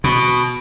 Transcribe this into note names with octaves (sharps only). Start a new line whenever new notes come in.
B2